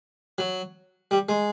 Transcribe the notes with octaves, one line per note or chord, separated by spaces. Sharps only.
F#3
G3
G#3